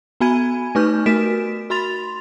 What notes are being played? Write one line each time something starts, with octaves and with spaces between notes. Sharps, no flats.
B3 F#4 G#5 B5 G#6 D#7
A3 D#4 B4 C#6 F6 G6
A3 F#4 A#4 B6 D7 E7
F#4 B5 C6 A6 F7